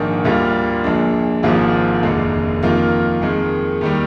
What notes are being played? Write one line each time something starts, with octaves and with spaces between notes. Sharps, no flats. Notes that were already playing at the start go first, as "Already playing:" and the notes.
Already playing: A#1 G#2 D#3 A#3 D4
D2 D3 G3 A#3 F4
A#1 A#2 G#3 D4
G#1 G#2 F3 A#3 F4
F1 D#2 D3 G#3
F2 D#3 A#3 F4
F2 D#3 G#3
D#2 D#3 G3